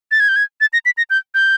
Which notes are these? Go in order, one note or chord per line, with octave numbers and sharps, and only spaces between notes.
A6
G#6
G6
G#6
A6
A#6
B6
A#6
G6
G6